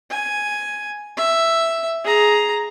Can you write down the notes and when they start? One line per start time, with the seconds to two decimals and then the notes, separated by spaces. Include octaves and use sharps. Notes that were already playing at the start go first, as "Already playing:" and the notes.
0.10 G#5
1.17 E5
2.04 G#4 A#5